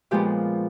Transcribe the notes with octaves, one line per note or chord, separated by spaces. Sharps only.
A#2 F3 G#3 B3 G4